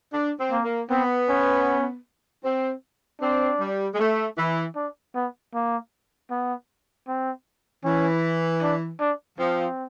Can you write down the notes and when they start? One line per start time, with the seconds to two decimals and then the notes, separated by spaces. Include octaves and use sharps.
0.13 D4
0.39 C4
0.52 A#3
0.65 A#3
0.90 B3 C4
1.29 C#4
2.45 C4
3.21 C4 D4
3.60 G3
3.95 G#3
4.00 A3
4.38 E3
4.76 D4
5.15 B3
5.54 A#3
6.31 B3
7.08 C4
7.84 E3 C#4
8.62 D4
9.00 D4
9.39 F3 C4